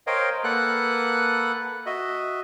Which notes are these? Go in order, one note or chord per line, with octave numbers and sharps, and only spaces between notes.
A#4 C5 C#5 D#5 F5 G5
A#3 A4 B4 F#5 F#6
F#4 D#5 E5